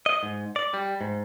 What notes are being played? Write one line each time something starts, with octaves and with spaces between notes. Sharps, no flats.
D#5
G#2
D5
G3
G#2